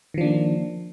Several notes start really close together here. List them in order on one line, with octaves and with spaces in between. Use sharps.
D#3 F3 D4 A#3